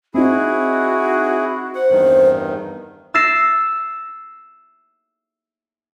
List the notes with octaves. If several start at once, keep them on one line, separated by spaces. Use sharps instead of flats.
C4 D#4 E4 F#4 G#4
C5 F#5
E2 G2 D#3
E6 A6 A#6 C7 E7